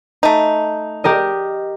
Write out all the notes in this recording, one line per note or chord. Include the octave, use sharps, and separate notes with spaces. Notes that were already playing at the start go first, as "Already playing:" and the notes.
A3 D#4
G4 A#4 D#5